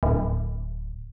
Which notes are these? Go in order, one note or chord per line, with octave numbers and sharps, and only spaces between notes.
D1